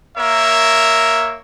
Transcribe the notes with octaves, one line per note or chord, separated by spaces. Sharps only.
A#3 A#4 C#5 E5